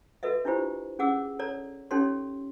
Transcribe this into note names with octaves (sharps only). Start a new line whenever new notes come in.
F#4 A4 B4 D#5 E5
D4 E4 F4 G4 C5
C#4 G#4 F#5 D6 E6
A4 C#5 D5 A#5
C#4 D#4 G4 A4 C#5 C6